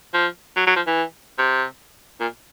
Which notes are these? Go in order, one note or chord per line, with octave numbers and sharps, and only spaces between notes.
F3
F#3
F#3
F3
E3
C3
A#2